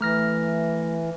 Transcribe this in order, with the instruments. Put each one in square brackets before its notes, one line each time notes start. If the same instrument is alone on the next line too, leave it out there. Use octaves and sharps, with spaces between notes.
[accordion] E3 [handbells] A3 F6 A#6